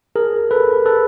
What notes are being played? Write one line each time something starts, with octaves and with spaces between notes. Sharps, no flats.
G#4 A#4
A4 B4
A4 B4